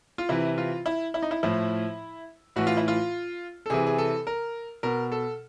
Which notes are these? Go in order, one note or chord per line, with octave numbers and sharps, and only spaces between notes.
F4
C3 E3 E4
F4
E4
E4
D#4
E4
A2 F3 E4
A2 E3 F#4
F4
E4
F4
A4
C3 E3 G#4
G#4
A4
A#4
B2 A#4
A4